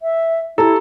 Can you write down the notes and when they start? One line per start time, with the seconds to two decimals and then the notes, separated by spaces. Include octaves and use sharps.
0.01 E5
0.58 E4 G4 A4 A#5